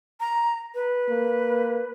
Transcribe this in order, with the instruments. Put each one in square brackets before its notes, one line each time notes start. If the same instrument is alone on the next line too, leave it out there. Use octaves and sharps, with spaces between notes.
[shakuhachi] A#5
B4
[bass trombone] A#3